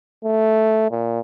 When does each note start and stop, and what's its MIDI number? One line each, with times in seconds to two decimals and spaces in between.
0.25 0.89 57
0.91 1.20 46